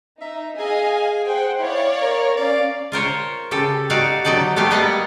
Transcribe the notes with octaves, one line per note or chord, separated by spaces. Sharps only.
D#4 E5
G#4 D#5 F5 G#5
G#4 C5 F#5 G5
E4 C#5 D5 F5
A#4
C#4 D5 F5
F4 A#4 C5 C#5
C#3 G4 A4
D#4 F#4 G4 D5 F5
F#3 B3 D#4 D5 A5
A3 B3 G4 F5
G3 A#3 B3 D#5 F5 F#5